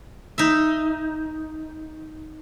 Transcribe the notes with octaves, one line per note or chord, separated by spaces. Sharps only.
D#4 E5